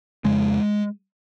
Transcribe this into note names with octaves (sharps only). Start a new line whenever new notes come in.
F2 C#3 G#3